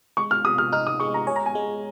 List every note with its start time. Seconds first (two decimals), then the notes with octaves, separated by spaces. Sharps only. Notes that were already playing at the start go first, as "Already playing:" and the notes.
0.17 G#3 C#6
0.31 F6
0.44 C3 D#6
0.58 F6
0.72 D#4 F6
0.87 D#6
1.00 G#3 C#6
1.14 A#5
1.27 C#5 G#5
1.36 A#5
1.46 G#5
1.55 G#3